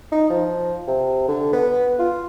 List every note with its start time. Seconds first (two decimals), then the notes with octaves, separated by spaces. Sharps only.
0.12 D#4
0.30 F3
0.87 C3
1.28 D3
1.53 B3
1.99 F4